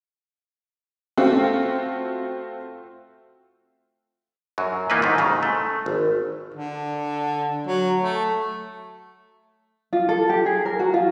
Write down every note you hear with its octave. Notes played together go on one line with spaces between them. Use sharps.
A3 C4 F4 F#4
F#2 F#3
E3 A#3 D#4 F4 B4
G#2 D#3 A3
G#2 C#3 F#3
A3
G#1
D3
F#3
A3
F4
A4
G4
G#4
A#4
F#4
F4